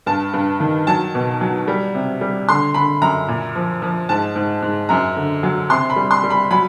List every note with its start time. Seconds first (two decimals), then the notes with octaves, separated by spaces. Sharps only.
0.06 G2 A5
0.34 G2
0.60 D#3
0.87 F#3 A5
1.15 B2
1.41 F#3
1.68 G3
1.95 C3
2.21 G3
2.49 D3 C6
2.74 D3 B5
3.01 F#2 A#5
3.28 A#2
3.55 F3
3.82 F3
4.09 G#2 A5
4.36 G#2
4.62 G#2
4.89 F#2 A#5
5.17 D3
5.43 F#3
5.70 C3 C6
5.90 B5
5.96 G3
6.11 C6
6.23 G3
6.30 B5
6.51 F#3 B5